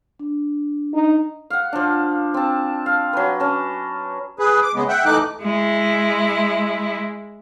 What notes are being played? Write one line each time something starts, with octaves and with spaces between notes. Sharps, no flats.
D4
D#4
F5 F#5
F3 D4
C4 A5
F5
F#3 B4
C#4 A5
G#4 B4
D6
C#3 G#3 B3
E5 F#5 G5
E3 A3 D#4 D6 F#6
G#3 E4